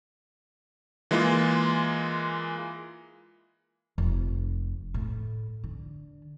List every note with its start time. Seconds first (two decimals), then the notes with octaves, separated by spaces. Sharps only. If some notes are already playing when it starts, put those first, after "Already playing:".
1.11 E3 G#3 A#3 F4
3.98 F1
4.94 A2
5.64 D3